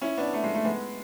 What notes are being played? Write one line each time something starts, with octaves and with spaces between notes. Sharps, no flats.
C#4 E4
B3 D4
A3
G#3
A3
G#3 B3